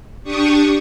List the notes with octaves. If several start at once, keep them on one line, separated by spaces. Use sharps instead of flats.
D4 G4 C#6 D#6